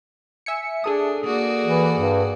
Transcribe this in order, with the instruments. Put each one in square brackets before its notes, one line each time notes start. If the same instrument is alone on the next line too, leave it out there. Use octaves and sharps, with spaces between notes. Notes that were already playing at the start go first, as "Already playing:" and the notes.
[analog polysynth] E5 G#5 C#7
[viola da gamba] D4 [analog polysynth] G#4 A4 D#6
[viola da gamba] A#3 F#4 D5
[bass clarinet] E3
G2